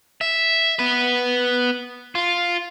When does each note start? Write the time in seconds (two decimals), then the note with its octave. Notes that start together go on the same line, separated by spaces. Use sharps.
0.21 E5
0.79 B3 B4
2.15 F4